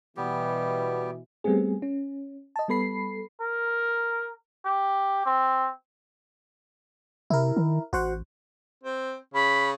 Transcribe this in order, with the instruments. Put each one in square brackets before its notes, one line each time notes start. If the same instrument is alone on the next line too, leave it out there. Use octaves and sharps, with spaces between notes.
[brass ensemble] B2 E3 [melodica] G3 B3 G4
[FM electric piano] G3 A3 B3 C4 G#4
C#4
D#5 A5
G3 B3 A4 B5 C7
[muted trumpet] A#4
G4
C4
[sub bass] C3 [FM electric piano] E4 A#4
[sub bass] D#3
[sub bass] A1 [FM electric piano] F#4 C5 F#5
[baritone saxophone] C4
[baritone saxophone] C#3 [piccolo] B5